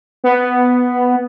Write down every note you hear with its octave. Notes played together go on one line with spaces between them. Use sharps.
B3